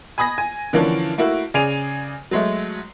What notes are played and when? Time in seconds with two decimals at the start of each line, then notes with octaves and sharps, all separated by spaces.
0.18 G#5 B5 D#6 G#6 A#6
0.38 G#5
0.73 D3 E3 F3 A#3 C#4 D4
1.18 A3 A#3 E4 F#4
1.54 C#3 G#4 D5 G#5 D#7 F7
2.31 F#3 G#3 A3